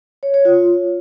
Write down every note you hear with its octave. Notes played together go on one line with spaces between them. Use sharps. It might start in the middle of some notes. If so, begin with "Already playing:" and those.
C#5
C#5
F4